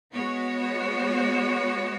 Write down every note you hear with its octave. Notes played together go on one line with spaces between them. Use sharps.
G#3 B3 F#4 C#5